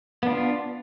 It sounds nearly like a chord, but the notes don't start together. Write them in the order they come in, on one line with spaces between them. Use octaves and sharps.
B3 D4 F4